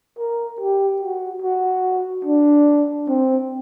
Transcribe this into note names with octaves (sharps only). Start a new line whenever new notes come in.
A#4
G4
F#4
F#4
D4
C4